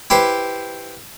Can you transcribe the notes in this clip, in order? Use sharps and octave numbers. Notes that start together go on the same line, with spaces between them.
E4 G4 B4 C5